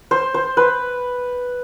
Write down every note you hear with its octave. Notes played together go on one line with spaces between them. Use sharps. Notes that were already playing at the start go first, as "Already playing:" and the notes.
C5
C5
B4